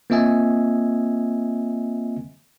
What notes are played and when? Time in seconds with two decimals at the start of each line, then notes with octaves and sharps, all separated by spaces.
0.10 A#3 C4 F4 D#5 E5 G#5